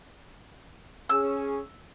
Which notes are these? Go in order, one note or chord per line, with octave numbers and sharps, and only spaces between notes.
C#4 G#4 E6